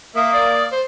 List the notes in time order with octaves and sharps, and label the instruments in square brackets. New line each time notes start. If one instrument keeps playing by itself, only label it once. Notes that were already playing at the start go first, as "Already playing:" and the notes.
[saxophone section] A#3 [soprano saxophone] E5 [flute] D#6
[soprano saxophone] D5
C5